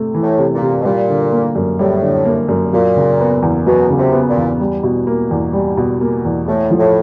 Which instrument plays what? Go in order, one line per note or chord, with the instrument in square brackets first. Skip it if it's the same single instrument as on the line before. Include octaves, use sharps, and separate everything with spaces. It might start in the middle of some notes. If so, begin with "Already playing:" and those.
Already playing: [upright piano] C3 A3
E3
[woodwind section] A2
[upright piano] C3
[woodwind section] A#2
[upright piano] C3
[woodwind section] B2
[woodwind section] A#2 [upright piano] G3
[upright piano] D3
A#3
F#2
[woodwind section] A2 [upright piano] G3
[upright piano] D3
A#3
F#2
[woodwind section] A#2 [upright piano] F#3
[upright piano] C#3
B3
E2
[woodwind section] B2 [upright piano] F#3
[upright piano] C#3
[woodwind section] C3
[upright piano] B3
[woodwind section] A#2
[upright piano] E2
G3
B2
A#3
E2
G3
B2
A#3
E2
[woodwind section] A2 [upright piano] A3
[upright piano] F3
[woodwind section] A2